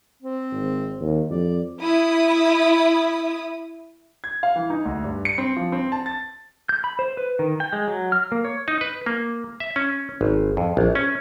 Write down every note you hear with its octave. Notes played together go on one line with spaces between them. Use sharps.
C4
G#1
D#2
F2 D5
E4 D#6
G#6
F5
E3
D#4
D2
G2
C#7
C4
F3
C4
A5
A6
G6
B5
C5
B4
D#3
G5
G#3
F#3
F6
A#3
C#5
D#4
B4
A#3
E5
C#4
G#1
F2
A#1
C#4